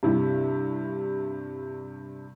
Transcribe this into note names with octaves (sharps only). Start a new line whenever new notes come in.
G2 C3 E4